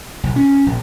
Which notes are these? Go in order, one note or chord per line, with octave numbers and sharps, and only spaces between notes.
B1
C#4
A#1